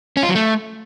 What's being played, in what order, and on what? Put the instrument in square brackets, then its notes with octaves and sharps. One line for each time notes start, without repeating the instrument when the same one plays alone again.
[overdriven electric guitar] C#4
F4
F#3
A3